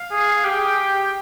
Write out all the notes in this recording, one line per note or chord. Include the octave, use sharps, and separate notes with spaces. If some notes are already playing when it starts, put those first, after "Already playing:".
Already playing: F5
G#4
G4 G5